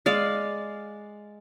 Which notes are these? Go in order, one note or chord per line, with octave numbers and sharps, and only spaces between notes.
G#3 D5 F5